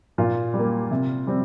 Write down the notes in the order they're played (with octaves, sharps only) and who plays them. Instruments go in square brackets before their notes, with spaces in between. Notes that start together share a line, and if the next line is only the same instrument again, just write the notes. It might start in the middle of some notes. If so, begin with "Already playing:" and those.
[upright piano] A#2 F4
G3
A#3
C3
G3 C4